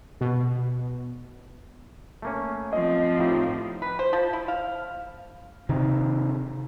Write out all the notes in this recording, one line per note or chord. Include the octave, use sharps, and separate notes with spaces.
B2
A3 A#3 C#4
F3 C4 F4 D#5
A2 D#4 F4 G4
B4
C5
F3
E4
F5
C3 D#3